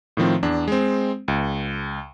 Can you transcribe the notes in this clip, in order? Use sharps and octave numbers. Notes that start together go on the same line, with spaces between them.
A2 D#3 F3 C4
E2 D4
G#3 C4
C#2